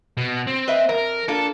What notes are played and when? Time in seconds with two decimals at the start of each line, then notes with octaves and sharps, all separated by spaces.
0.17 B2
0.47 C4
0.68 B4 D#5 E5
0.89 F2 A#4
1.28 A#3 D4 F4 A4